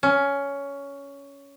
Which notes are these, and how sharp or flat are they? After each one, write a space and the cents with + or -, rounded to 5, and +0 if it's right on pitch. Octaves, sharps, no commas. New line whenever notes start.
C#4 +15